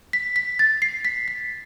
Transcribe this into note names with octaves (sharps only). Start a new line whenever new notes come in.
B6
B6
A6
C7
B6
B6